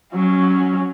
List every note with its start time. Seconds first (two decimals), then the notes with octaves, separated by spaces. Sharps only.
0.14 F#3 C#4